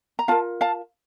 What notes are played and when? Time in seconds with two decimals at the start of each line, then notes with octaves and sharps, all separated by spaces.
0.19 A#5
0.28 F4 A#4 F5 A5
0.61 F5 A5